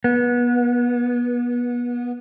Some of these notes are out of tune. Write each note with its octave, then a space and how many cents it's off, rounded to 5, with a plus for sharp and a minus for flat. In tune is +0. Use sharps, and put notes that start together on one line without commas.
B3 -30